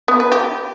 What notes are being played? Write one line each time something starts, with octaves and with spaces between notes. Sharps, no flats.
B3
B4
G4